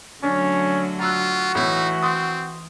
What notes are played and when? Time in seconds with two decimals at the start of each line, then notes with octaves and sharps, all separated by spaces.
0.23 D3 F#3 A3 C#4 D4
1.00 F4 F#4 A#5 E6 F#6
1.55 A2 E3 D#4
2.02 C4 C6 D#6